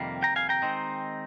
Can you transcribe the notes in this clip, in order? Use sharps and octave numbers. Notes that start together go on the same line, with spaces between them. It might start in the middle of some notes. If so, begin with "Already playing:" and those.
Already playing: F2 C3 D#3 G3 A#3
G5 A#5
F5 G#5
G5 A#5
D#3 G#3 C4 D#4